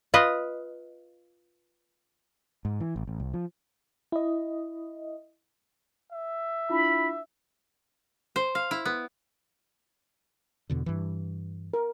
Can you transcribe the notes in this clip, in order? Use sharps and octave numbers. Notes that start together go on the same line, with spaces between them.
F4 B4 D#5
G#2
E3
A1
A1
C2
F3
E4 D#5
E5
D4 E4 F4 B5
C5
F5
E4
B3
E2 B2 D3
G2 E3
A#4